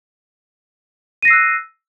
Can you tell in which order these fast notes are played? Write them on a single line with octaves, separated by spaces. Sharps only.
D#7 A#6 C7 E6 F#6